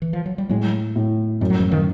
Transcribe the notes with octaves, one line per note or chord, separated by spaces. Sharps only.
E3
F3
F#3
G3
A2 F#3 G#3
A2
F#2 G3
F#3
F3 G3
D#3 F3